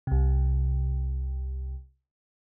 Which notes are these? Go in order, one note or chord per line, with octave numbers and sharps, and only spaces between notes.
C2 C3